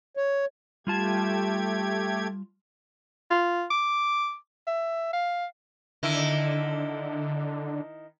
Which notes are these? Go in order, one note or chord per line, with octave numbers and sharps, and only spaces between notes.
C#5
G3 A3 F4 G4 A5 G#6
F4
D6
E5
F5
D3 D#3 E4